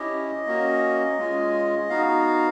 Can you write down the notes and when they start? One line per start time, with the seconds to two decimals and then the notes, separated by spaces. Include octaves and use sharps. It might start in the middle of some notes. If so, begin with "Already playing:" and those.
Already playing: C#4 E4 G4 D#5
0.46 A#3 C#4 F#4
1.17 G#3 C#4 F4 G#4
1.89 B3 D#4 F#4 F5